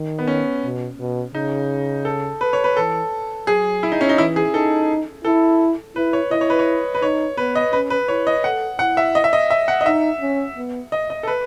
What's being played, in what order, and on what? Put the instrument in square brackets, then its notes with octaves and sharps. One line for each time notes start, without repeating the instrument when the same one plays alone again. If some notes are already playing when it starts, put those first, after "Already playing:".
Already playing: [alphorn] D#3
[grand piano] B3
C#4
[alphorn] B2
B2
[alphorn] C#3 [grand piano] D#4
[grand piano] A4
B4
C#5
B4
[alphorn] E3 [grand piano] A4
[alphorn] F#3 [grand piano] G#4
[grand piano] E4
D#4
C#4
D#4
[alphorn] E3 [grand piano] E4
[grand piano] G#4
[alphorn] D#4 [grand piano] A4
[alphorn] E4 [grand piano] A4
[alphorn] E4 [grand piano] B4
[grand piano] C#5
[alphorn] E4 [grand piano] D#5
[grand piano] C#5
B4
C#5
B4
[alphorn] D#4 [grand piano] C#5
[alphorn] B3 [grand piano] B4
[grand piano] D#5
[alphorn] C#4 [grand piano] B4
[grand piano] B4
[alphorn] E4 [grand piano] C#5
[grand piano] D#5
[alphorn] A4 [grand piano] F#5
[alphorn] E4 [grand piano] F#5
[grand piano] E5
D#5
E5
D#5
E5
F#5
D#5
[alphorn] D#4 [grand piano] E5
[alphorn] C#4
B3
[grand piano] D#5
D#5
A4
B4